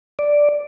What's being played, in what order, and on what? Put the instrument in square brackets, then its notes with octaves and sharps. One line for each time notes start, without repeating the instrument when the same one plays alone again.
[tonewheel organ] D5